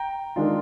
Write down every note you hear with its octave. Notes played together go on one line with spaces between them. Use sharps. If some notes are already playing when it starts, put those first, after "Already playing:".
Already playing: G5 A#5
D#3 G#3 D4 F4